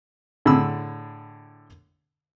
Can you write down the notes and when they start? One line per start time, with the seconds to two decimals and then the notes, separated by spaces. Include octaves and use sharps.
0.46 A2 D3 G#4 B5 E6